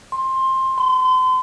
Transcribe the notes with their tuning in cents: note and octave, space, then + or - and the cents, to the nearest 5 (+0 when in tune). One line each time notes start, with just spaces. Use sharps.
C6 +15
C6 -40